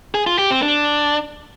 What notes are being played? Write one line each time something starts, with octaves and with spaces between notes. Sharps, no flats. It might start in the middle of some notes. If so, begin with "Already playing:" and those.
G#4
F4
G4
C4
D4